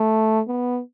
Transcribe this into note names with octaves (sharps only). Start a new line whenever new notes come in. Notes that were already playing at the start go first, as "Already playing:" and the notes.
Already playing: A3
B3